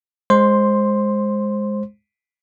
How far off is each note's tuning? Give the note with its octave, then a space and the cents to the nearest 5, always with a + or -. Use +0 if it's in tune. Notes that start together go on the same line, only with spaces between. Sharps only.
G#3 -5 C5 +15 C6 +0